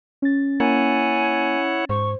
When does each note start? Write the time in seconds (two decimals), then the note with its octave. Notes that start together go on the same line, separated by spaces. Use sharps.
0.22 C#4 A6
0.60 A#3 E4 C#5 F#5 G#5
1.89 G#2 C5 C#6